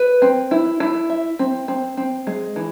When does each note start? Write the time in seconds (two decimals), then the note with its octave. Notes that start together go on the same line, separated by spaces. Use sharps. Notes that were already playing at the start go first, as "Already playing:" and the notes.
Already playing: B4
0.22 C4
0.51 E4
0.80 E4
1.10 E5
1.39 C4
1.68 C4
1.97 C4
2.27 G#3
2.56 E3